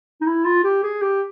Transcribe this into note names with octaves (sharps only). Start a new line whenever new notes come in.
D#4
E4
F4
G4
G#4
G4